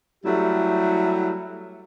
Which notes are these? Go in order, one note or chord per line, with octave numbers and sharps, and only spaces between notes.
F#3 G3 A3 E4 G4